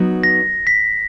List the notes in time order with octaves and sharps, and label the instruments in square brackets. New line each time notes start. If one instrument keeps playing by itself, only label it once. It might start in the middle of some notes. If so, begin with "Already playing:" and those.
Already playing: [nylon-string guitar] F#3 B3 D#4
[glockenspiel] A#6
B6